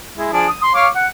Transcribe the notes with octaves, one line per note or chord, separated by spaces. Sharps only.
G#3 E4
F3 D4 G#4
D#6
C6
C#5 F5 D6
F#5